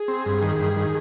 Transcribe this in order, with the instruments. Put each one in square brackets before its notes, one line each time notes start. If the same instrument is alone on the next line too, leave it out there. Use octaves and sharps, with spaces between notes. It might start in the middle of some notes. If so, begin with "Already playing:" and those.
Already playing: [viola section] G#4
[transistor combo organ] C4
G2
D#3
G2
D#3